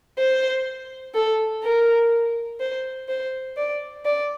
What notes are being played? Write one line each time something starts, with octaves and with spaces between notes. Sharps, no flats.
C5
A4
A#4
C5
C5
D5
D5